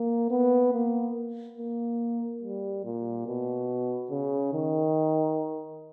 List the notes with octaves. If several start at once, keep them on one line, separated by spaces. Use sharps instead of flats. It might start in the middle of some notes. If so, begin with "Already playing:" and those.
Already playing: A#3
B3
A#3
A#3
G3
A#2
B2
C#3
D#3